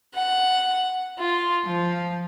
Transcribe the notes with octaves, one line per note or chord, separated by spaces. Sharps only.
F#5
F4
F3